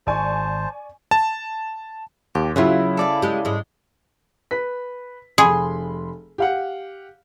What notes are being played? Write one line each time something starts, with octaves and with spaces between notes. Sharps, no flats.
G#1 C5 D5 G#5 A5 C#6
A5
D#2 G4
C#3 F#3 B3 E4 F4 E5
A4 D5 F5
G#3 G4
G#2 G#3
B4 B6
F1 G#4 B5 C6
G4 F5 F#5